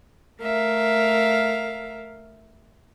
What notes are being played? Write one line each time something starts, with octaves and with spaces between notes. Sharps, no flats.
A3 A#4 E5 F5